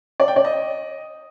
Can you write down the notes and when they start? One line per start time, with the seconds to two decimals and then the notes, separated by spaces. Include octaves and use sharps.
0.20 D5
0.28 G5
0.36 D5
0.45 D#5